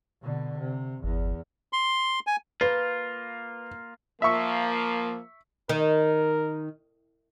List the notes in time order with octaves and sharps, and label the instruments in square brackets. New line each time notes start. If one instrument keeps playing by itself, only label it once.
[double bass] B2 D3
C3
[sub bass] G1 [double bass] E2
[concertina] C6
G#5
[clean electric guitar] A#3 F4 [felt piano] B4
[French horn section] F3 A#3 [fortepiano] E5 C#6
[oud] D#3 [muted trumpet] A#4